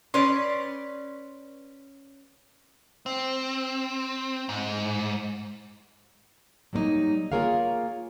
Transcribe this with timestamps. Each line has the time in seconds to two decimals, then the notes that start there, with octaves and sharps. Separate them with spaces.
0.14 C#4 B4 D5 C6
3.06 C4
4.49 G#2
6.73 F#3 G3 A#3 C4 D#4
7.32 A#3 F4 G#4 A#4 C#5 F5